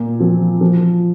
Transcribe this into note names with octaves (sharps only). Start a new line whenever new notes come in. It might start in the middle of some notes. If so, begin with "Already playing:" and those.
Already playing: A#2
F3 C4
F3